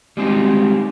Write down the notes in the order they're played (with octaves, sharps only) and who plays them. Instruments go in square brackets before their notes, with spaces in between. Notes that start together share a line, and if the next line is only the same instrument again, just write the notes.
[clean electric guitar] G3 G#3 C4 D#4